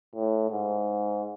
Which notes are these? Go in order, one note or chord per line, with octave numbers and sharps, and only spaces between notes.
A2
G#2